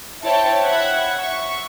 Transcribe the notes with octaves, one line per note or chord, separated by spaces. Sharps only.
E4 C5 C#5 G5 A5
E5 F#5 B5 G#6
E5 C#6